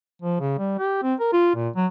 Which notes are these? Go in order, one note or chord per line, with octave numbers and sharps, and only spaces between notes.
F3
C#3
G3
G4
C4
A#4
F4
A#2
F#3